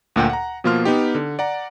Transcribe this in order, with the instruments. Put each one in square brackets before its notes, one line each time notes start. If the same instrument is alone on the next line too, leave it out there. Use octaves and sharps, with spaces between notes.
[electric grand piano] D2 A#2 F#5 G5
F#5 A#5
B2 F3 A#3 F4 C6 F6
B3 D#4 G4
D3
D5 F#5 A#5